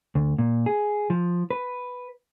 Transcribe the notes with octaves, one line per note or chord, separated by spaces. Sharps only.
D2
A#2
G#4
F3
B4